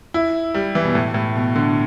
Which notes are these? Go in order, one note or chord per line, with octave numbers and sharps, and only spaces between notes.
E4
G3
E3
B2
A2
A2
B2
D3